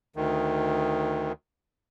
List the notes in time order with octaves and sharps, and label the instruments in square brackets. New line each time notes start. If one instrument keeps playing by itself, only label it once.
[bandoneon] D2 D#3